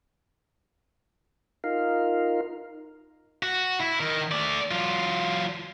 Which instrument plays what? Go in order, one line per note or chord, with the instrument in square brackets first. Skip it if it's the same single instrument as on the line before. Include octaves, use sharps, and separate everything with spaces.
[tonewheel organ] D#4 F4 A#4 F5
[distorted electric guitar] F#4
E4
D#3 A#4
A3 D5
F#3 F4